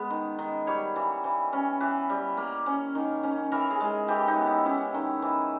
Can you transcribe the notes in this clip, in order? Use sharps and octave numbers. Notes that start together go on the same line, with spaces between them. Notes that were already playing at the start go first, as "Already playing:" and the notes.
Already playing: G#3 B3
D#3
D#3
G3 C#5
E3
E3
C#4
E3 B4
G3
A#3
C#4
D#3
C#4
E3 A#4
G#4
G#3
E3 G4
D#4
B3
E4
C#4 E4
D#3
E3